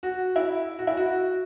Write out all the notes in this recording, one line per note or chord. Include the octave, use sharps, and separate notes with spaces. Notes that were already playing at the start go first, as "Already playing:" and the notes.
F#4
E4
F#4
E4
F#4